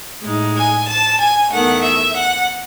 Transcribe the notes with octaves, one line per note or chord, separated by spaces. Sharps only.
A2 G#3 D#4
G#5
A5
G#5
E2 D#3 A3 F#5
E5
F#5